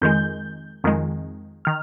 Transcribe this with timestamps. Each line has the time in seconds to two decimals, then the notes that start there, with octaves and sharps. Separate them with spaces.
0.02 F2 D#3 G#3 G6
0.84 F2 D#3 G#3
1.65 D#3 F6